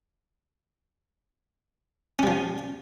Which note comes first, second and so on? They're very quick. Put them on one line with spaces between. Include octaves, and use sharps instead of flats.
C#4 G3 F3